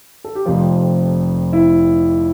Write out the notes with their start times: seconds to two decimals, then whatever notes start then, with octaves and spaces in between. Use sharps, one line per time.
0.24 A4
0.35 G4
0.45 F1 F2 C3 F3 F4
1.53 E4